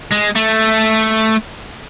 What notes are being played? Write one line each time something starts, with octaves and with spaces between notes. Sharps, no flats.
G#3
A3